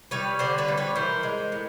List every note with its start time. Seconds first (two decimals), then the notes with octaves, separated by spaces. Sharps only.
0.11 G3 B4 C#5
0.39 D3 C5 D5
0.58 B4 C#5
0.68 G3
0.77 B4 C#5
0.95 E3 A#4 C5
1.23 G#3
1.52 A2